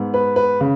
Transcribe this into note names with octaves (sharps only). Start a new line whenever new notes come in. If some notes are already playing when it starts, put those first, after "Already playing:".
Already playing: G#2 G#3 B3
B4
B4
C#3